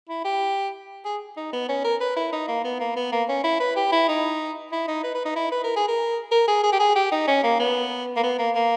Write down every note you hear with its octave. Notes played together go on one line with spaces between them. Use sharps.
E4
G4
G#4
D#4
B3
C#4
A#4
B4
E4
D#4
A#3
B3
A#3
B3
A#3
C#4
E4
B4
G4
E4
D#4
E4
D#4
B4
B4
D#4
E4
B4
A#4
G#4
A#4
A#4
G#4
G#4
G4
G#4
G4
D#4
C#4
A#3
B3
A#3
B3
A#3
A#3